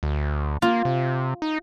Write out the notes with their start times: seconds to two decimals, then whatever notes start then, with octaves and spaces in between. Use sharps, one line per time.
0.03 D2
0.62 A#3 F4
0.85 C3
1.42 D#4